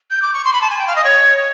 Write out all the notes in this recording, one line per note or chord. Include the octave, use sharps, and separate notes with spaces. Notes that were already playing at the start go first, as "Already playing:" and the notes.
G6
D6
C#6
C6
B5
A5
G#5
G5
F5
D#5
C#5